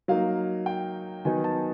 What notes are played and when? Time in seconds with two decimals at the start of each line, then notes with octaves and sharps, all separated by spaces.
0.08 F#3 A#3 D#4 F5
0.66 G5
1.25 D#3 F#3 B3 D#4 G#5
1.44 A5